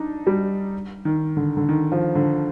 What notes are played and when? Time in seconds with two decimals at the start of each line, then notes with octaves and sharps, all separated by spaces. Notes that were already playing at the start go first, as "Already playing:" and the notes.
Already playing: D4 D#4
0.27 G3
1.05 D#3
1.37 D3
1.57 D3
1.69 D#3
1.92 F3
2.15 D3